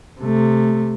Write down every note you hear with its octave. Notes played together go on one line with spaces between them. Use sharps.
C3 A3